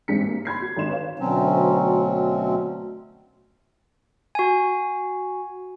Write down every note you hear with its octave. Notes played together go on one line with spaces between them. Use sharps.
A1 G#2 C4 D4 B6 C#7
A#3
B5 C6 G#6 C7
F#4
G#1 D3 D#4 C6 E7
B4 C#5 F5
D2 B2 F#3 C4 C#4
F#4 G#5